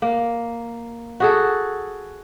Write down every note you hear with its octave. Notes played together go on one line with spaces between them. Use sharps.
A#3
F#4 G#4 A4